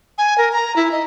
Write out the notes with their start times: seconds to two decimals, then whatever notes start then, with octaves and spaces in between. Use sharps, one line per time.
0.18 G#5
0.38 A#4
0.52 A#5
0.76 E4
0.92 D#5